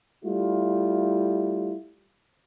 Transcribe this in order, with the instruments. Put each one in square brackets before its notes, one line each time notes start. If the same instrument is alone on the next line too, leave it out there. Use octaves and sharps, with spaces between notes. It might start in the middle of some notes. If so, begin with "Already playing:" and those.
[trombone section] G3 A3 E4 F4